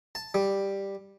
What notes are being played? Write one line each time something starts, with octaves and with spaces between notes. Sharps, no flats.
A5
G3